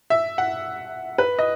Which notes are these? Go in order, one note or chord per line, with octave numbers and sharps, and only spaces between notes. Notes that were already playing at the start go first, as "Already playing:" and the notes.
E5
F#5
B4
D#5